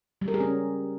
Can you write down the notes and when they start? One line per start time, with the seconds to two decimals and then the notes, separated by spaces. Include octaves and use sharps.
0.21 G3
0.28 A#4
0.34 G#4
0.40 C#4